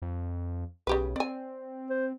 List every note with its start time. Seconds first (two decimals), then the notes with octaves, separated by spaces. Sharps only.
0.02 F2
0.87 B1 C#3 G4 B4
1.16 C4 D5 G#5
1.90 C5